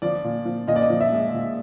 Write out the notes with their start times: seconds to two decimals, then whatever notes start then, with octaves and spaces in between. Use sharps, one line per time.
0.02 F3 D5
0.24 A#2
0.45 F3
0.67 A#2 D#5
0.76 D5
0.82 D#5
0.90 F3
1.01 E5
1.12 G#3
1.34 A#2